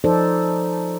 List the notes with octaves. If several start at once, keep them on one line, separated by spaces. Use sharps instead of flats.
F3 D#4 A4 C5 D5